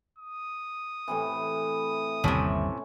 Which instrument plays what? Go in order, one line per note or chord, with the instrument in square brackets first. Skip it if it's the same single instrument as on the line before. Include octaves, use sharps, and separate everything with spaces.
[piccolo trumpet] D#6
[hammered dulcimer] A2 C3 E3
[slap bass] G1 D#2 G3 [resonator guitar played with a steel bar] A2 C3 [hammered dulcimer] C#4